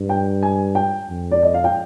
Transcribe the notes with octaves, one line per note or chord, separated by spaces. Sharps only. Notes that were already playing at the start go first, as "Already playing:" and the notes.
Already playing: G2
G5
G#5
G5
F2
D5
D#5
F5
G5